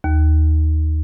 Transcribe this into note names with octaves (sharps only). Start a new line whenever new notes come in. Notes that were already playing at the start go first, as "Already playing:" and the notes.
D#2